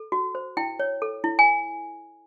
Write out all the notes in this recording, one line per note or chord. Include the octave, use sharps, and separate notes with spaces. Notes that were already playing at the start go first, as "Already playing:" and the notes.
Already playing: A4
F#4
C5
E4 G5
C#5
A4
E4
G#5